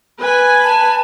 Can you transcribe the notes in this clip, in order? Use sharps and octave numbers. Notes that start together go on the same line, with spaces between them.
B4 G#5
A5